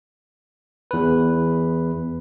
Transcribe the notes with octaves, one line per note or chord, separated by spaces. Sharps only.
E2 B4